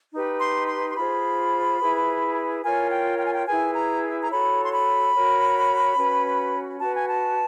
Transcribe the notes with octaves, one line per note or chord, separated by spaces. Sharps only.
D#4 G4 B4
C6
C6
C6
F4 G#4 C5 B5
E4 G#4 B4
F4 A#4 C#5 G#5
G5
G5
G#5
G5
E4 G#4 B4 G#5
A#5
A#5
F#4 A4 C#5 B5
C6
B5
F#4 A#4 C#5
C#4 F#4 B4
F#4 B4 A5
G#5
A5